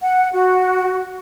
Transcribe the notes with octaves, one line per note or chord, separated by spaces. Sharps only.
F#5
F#4